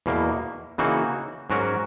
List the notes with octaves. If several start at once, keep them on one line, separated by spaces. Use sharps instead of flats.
E2 B2 A#3
C#3 E3 A#3 D#4 F#4
G#2 F#3 C#4 F#4 A#4